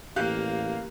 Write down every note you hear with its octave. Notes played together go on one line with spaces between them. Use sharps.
A1 A#3 G4 F5 F#6 G6